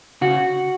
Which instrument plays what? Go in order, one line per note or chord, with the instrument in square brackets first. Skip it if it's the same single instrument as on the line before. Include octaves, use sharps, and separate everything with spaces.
[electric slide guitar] C#3 F#4